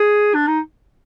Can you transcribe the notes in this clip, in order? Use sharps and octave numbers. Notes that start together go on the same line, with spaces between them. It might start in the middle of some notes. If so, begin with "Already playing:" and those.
Already playing: G#4
D4
D#4